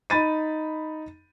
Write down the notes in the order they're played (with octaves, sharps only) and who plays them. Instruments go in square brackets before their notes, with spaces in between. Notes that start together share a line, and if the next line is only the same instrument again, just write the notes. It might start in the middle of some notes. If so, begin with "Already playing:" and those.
[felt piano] D#4 B5 A6 D#7